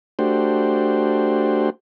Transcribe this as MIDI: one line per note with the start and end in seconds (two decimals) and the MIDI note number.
0.19 1.70 57
0.19 1.70 62
0.19 1.70 66
0.19 1.70 67
0.19 1.70 72